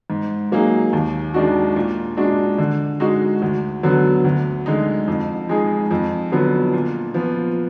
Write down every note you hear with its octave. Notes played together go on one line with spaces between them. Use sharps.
G#2
F#3 A#3 D#4 G#4
D#2
D#3 G#3 D4 F#4
A#2
G#3 D4 F#4
D3
G#3 D#4 F#4
D2
D3 F#3 B3
D2
D3 G#3 D#4
F2
F3 G#3 D#4 G#4
F2
D3 F#3 B3
A#2
F3 B3